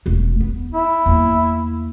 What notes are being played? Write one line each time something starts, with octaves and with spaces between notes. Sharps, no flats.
E1 A3
B3
E4
E2 A#3